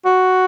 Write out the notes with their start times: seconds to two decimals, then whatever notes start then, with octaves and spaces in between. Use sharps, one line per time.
0.05 F#4